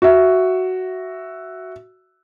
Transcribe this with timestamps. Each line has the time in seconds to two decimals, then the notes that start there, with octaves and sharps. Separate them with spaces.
0.02 F#4 E5